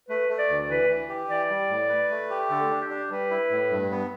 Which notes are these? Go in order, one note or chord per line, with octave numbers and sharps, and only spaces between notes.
A3 B4
A3
D5
D2
E3 B4
E3
G4
E3 D5
G3
A2
B4
A3
G4
D3 A4
D4
G4
D4
G3 B4
E4
A2
G2
B3